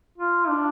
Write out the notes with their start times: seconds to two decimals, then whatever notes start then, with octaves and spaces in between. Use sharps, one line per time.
0.18 F4
0.49 D4